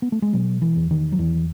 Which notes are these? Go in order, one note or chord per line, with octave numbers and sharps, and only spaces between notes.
B3
A3
G#3
B2 F#3
E3
E2
D#3
F#3
E2 E3